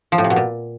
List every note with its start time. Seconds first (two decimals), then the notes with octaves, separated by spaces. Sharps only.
0.12 F3
0.18 A2
0.24 C3
0.30 B2
0.36 A#2